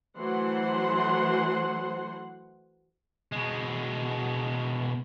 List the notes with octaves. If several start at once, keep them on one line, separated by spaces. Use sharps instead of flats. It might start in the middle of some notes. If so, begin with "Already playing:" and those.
E3 F#3 A3 C5 F#5 C6
B2 G#3